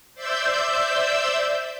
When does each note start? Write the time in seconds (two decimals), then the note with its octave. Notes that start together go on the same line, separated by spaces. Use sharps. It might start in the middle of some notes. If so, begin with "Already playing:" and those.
0.14 C5 D5 E5 E6 G6